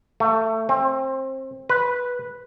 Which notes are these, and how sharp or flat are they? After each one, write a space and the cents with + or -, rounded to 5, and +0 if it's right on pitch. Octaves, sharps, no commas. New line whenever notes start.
A3 +20
C4 +25
B4 -10